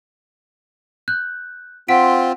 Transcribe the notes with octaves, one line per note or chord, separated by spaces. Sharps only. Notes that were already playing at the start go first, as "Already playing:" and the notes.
F#6 G6
C4 F4 F#5 B6 D7